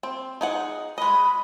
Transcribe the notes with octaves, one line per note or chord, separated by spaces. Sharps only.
C4
D#4 G#4 F#5
G#3 D#5 B5